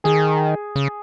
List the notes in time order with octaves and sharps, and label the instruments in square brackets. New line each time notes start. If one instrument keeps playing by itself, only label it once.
[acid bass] D#3 [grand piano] G#4
[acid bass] C#3